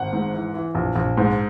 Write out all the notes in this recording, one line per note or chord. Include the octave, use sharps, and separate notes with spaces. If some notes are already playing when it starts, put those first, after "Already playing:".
Already playing: G#1 F#5
G#2
E3
E3
A#1
A#1
G#2